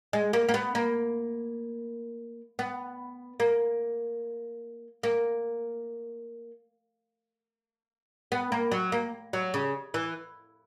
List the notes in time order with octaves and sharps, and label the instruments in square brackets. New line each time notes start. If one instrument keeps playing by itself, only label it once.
[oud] G#3
A#3
A#3
B3
A#3
B3
A#3
A#3
B3
A#3
F#3
A#3
F#3
C#3
E3